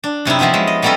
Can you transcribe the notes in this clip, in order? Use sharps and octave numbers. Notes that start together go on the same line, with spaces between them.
D4
F#2 C3 D#4 E4
F3 F#3 B3 E4 F4
G#3
D#5
G3 A#3 B3 C#4 A4 D#5